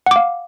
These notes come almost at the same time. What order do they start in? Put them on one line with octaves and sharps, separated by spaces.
F#5 D6 F5